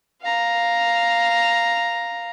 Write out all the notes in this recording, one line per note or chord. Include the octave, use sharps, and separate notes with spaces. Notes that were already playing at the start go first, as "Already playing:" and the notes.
F5 A#5